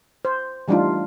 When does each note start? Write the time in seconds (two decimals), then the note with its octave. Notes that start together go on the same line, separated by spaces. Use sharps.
0.25 C5
0.68 E3 G3 A3 D4 D#4 F4